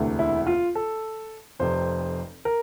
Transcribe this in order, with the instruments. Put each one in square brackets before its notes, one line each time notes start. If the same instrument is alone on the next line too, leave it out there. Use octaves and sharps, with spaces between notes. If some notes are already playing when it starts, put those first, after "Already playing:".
Already playing: [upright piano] E1 D2 C3 E3 A3
[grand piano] E4
F4
A4
[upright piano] F1 F2 C3 [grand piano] C5
[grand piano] A#4